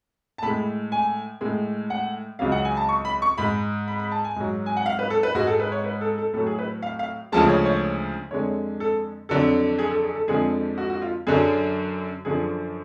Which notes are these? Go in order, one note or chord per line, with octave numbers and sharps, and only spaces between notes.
A5
A2 G#3 B5
G#5
A2 G#3
F#5
C#2 C#3 F#3 F5
F#5
G#5
A5
C#6
B5
C#6
G#2 G#3 B5
B5
B5
A5
G#5
G#2 F#3
G#5
F#5
F5
B4
A4
B4
G#2 G#3 F#4
A4
B4
C#5
B4
A4
A4
A2 F#3 A4
G#4
B4
F5
F5
D2 C#3 F3 G#3 A5
C#5
C#5
F2 D3 G#3 C#5
A4
F2 D3 F#3 A4
G#4
A4
G#4
A4
F2 D3 F3 G#3 G#4
F#4
F#4
F4
F#2 D3 F#3 G#4
F#2 D3 F3 G#4